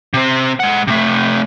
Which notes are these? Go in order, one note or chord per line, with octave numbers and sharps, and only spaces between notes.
C3 C4
G#3 F#5
C3 A3